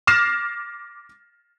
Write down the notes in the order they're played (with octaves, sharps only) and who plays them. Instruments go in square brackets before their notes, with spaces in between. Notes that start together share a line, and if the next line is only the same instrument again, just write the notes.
[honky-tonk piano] D6 F6 A6 A#6 C7 E7